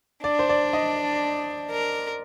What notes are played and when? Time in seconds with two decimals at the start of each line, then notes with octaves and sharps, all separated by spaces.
0.24 D4 D5
0.39 C5
0.49 D5
0.73 D#5
1.71 A#4